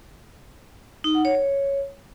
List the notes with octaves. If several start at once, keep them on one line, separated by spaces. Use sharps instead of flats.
D#4
F#5
C#5
C#5